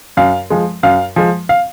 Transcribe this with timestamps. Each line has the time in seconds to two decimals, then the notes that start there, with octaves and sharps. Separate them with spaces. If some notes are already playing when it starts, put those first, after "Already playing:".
0.17 F#2 F5
0.50 F3 G#3
0.83 F#2 F5
1.16 F3 G#3
1.49 F5